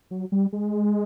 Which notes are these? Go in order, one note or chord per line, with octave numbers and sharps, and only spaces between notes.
F#3
G3
G#3